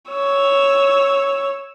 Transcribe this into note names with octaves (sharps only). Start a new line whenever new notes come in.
C#5 E6